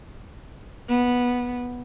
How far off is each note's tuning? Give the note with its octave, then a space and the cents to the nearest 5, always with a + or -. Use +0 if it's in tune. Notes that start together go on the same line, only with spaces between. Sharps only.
B3 -10